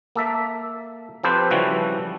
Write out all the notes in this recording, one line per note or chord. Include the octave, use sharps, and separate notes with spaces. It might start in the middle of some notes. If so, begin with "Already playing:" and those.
A#3 A4 E5
F3 C4 G4 A4 B4 C5
C#3 E3 F3 G3 F#4 A4